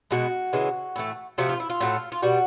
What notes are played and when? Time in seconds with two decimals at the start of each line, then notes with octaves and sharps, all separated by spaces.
0.11 B2 G#3 F#4
0.53 C#3 E3 G#3
0.96 A2 E3 A3
1.38 C3 F3 A3 F#4
1.49 F4
1.60 E4
1.70 F4
1.80 A2 F#3 A3
2.12 F4
2.22 B2 G3 F#4